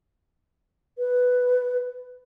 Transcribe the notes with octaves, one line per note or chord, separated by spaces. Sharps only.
B4